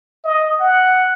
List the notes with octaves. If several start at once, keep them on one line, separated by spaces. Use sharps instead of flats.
D#5
F#5